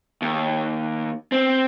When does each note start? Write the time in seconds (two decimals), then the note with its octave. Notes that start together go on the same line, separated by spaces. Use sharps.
0.22 D#2
1.32 C4